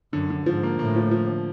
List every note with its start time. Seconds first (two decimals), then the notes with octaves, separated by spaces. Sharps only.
0.13 F#2 D3
0.30 D3
0.46 G#2 F3
0.63 A#3
0.79 A2 A#3
0.96 F3
1.11 F3
1.28 D3